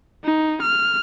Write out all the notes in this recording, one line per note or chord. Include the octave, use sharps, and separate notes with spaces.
D#4
F6